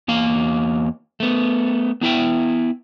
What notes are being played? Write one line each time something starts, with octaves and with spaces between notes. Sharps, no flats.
E2 A#3 F5
A3 B3
B3 E4 E5 G5